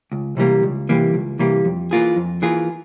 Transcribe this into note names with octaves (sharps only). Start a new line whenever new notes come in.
C#2
C3 E3 G3 A#3
C#2
C3 E3 G3 A#3
C#2
C3 E3 G3 A#3
F2
E3 A#3 F4 G#4
F2
E3 A#3 F4 G#4